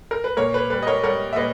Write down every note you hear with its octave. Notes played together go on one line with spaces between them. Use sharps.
A#4
B4
A#2 A#4 C#5
B4
G3 B4
D#5
A#4 C#5
G3 A#4 C#5
E5
A#2 B4 D#5